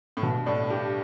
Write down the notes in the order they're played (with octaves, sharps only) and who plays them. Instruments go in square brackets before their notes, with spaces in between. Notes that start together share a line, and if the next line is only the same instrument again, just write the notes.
[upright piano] A2
[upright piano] G2 [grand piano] B2
[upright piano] A2 [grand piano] D4
[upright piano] G2 [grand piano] G4